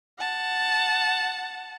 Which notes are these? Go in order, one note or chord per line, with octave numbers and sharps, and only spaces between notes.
F#5 A5